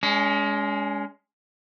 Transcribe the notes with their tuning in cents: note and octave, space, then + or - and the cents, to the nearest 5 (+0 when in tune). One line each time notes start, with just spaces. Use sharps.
G#3 +0 C#4 +40